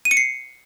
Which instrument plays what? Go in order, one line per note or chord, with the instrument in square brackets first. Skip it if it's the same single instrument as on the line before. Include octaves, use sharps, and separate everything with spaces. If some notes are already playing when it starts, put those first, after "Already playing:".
[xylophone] D#7
C#7
C7